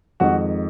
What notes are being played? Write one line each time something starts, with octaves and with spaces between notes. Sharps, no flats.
F2 D#3 G#3 F#4